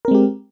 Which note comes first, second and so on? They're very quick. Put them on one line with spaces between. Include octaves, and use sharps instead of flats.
A#4 C4 G#3 G4